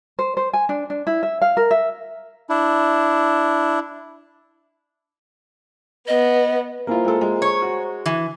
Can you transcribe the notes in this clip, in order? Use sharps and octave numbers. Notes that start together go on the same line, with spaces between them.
C5
C5
G#5
D4
D4
E4
E5
F5
A#4
E5
D4 E4
B3 D#5
A#3 E4 F4 C5 G#5 A#5
G#3 A4
G#3
C#5
F#4
E3